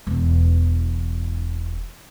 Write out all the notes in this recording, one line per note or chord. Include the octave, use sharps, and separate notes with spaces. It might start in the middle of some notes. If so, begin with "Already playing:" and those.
E1 E2